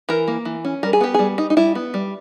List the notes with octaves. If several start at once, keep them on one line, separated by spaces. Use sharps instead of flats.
E3 A#4
A#3
E3
C#4
G3 A#4
G#4
B3 G4
G3 G#4
D#4
D#4
G3 E4
B3
G3